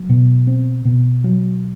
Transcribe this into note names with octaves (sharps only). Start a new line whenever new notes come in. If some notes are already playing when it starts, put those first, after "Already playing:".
Already playing: F#3
B2
C4
B2
F#3